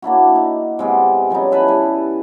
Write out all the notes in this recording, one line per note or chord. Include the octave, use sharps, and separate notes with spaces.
A#3 D4 E4 F#4
D#4
C3 G#3 B3 D5
F3 G3 C#4 D#4
E4 B4 A5 B5
G3